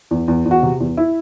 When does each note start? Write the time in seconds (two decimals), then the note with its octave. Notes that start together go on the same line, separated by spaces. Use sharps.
0.11 E2
0.28 E2
0.45 E2
0.51 F#4
0.63 C3
0.80 E2
0.97 E4